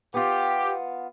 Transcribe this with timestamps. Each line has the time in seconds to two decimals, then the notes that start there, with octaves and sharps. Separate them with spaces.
0.14 B3 F4 G4